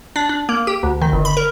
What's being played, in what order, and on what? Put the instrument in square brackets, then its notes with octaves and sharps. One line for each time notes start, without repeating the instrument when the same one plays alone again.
[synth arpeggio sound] D4
D4
A#3
G4
D2
D#3
G1
B5
A#4